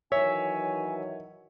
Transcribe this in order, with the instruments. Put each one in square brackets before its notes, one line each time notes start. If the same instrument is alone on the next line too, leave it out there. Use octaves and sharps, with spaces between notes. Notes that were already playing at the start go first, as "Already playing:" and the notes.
[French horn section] D#3 E3 F#3 [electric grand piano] C#5 [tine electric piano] E5 [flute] G#5